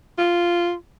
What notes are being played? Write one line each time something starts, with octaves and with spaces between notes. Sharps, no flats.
F4